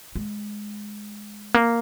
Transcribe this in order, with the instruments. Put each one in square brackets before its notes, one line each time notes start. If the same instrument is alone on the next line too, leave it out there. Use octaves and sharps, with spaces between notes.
[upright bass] G#3
A#3